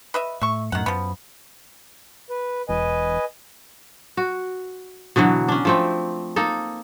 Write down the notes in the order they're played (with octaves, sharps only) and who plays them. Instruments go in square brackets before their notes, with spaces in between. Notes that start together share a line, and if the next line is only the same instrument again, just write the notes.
[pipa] B4 D#5 E5
[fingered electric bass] A2 [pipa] E5 C#6
[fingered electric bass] F#2 A2 [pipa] D#3 F#5
[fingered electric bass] F#2 [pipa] F3 B3
[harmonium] B4
[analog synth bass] E1 [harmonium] B4 D#5 G#5
[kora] F#4
B2 D3 E3 F#3
C#4 D4
F3 A3 C4
A#3 D#4 A4